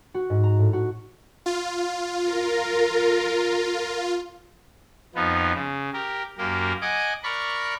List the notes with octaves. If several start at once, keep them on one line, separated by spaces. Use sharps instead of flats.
F#4
G#2
A#5
A2
F#4
F4
A#4
F2 F3 B3 D#4
C#3
G4 A#4
F#2 A#3 G4 A#4
D#5 F#5 G#5 D6
A#4 D5 B5 C#6 F#6